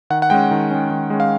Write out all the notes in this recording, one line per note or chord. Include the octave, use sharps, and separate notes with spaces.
D#3 F#5
F#5
G#3 C#4 G5
D#3
G#3 C#4
D#3
G#3 C#4
F5